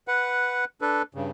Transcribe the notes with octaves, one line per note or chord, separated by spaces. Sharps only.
B4 F#5
D4 A4 B4
G2 C#3